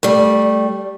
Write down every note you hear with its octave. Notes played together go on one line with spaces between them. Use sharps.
G3 A3